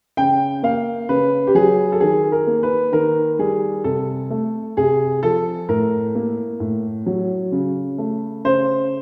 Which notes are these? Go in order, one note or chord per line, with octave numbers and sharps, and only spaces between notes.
C#3 G5
A#3 F5
C#3 B4
G4
F#3 G#4
A4
D#3 G#4
A#4
A#3
B4
D#3 A#4
G3 G#4
C3 A4
A3
C3 G#4
F3 A4
A2 A#4
A#3
A2
F#3
C#3
A3
C#3 C5